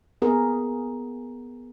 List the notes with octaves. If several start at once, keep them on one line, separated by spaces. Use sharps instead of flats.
B3 G#4 A#4